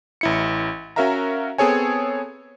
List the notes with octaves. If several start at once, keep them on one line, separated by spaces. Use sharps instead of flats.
A1 E4 C#7
C#4 F#4 A#4 E5 F5 A#5
B3 C4 G#4 A4 C#5 G#5